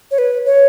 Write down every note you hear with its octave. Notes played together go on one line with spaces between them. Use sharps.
C#5
B4
C#5